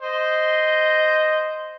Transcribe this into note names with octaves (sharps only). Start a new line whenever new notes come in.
C5 D#5